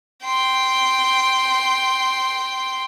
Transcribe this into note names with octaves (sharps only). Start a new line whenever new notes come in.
G5 C6